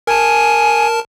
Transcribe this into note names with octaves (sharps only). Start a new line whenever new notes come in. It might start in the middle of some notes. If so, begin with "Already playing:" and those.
A#4 G#5 A5